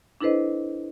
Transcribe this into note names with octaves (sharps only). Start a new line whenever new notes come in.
D4 E4 A4 B4 C5 D#5